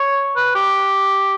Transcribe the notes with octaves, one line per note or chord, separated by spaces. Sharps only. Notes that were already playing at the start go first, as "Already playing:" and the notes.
Already playing: C#5
B4
G4